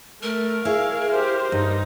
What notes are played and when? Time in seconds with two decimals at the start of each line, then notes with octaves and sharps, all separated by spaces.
0.22 A3 A#4
0.65 E4 G#4 C#5 F5
1.10 G4 C5
1.52 G2 D#4